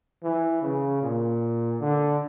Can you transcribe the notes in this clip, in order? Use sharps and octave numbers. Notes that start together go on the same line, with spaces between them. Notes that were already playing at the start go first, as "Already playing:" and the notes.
E3
C#3
A#2
D3